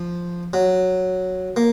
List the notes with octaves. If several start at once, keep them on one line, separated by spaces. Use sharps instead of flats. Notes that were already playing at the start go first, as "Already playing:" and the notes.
Already playing: F3
F#3
A#3